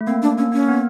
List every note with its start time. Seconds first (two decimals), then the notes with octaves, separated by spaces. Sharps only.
0.01 A3
0.07 A#3 C4
0.22 D4
0.38 A#3 C#4
0.52 A#3 C#4
0.68 B3